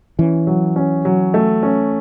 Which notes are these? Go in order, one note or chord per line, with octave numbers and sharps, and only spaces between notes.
E3 C#4
F#3
C#4
F#3
A3
C#4